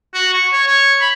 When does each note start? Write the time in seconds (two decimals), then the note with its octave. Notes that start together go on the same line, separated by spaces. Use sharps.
0.14 F#4
0.34 C#6
0.53 C#5
0.67 C#5
1.01 B5